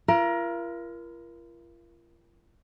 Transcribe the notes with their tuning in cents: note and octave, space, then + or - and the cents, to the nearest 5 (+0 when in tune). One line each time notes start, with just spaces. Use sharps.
F4 -40 A#4 +25